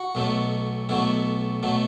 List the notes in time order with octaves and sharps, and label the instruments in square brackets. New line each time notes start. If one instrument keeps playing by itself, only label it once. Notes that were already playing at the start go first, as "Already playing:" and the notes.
Already playing: [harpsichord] F#4
B1 B2 F#3 A3
B1 B2 F#3 A3 E4
B2 F#3 A3